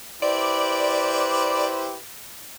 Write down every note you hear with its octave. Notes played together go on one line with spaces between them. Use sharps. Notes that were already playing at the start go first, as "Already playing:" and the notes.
E4 G4 B4 C5 D5